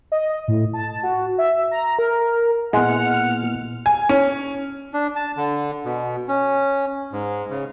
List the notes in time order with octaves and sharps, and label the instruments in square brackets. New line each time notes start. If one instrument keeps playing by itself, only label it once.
[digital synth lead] D#5
A2
A5
F#4
E5
A#5
A#4
[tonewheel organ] A#2 F6 [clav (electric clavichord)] G#3 [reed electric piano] B3 E4 [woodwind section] F#5
[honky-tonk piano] G#5
C#4
[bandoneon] D4
A5
D3
B2
C#4
G#2
C#3